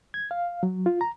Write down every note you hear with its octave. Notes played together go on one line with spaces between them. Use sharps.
G#6
F5
F#3
F4
A#5